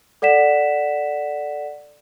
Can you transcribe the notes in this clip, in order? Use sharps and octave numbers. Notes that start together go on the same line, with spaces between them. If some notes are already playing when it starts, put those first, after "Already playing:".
A4 D5 F#5 B6 E7